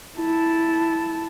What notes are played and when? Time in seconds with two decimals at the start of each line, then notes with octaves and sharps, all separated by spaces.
0.18 E4 A5